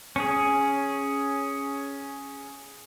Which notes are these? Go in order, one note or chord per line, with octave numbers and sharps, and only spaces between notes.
C#4 G#4